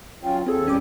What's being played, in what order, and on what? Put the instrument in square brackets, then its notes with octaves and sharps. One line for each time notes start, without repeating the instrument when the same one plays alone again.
[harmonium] F#3 C#4 F4 [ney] G5
[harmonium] D#2 [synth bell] C4 G#4 [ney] A4
[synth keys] E2 C#4 D6 [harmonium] A2 G3 G4